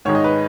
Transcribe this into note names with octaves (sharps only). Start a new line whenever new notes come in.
G#2 D#3 G#3 C#5
D#5
B4